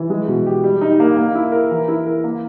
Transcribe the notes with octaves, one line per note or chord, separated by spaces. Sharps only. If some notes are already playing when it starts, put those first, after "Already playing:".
Already playing: E3
G#3
B2
G4
G3
D#4
A#3
A#3
E4
A#4
E3
E4
A#4
A#3